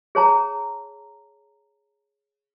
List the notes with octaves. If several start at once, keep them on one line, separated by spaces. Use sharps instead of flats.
G#4 C#5 A5 A#5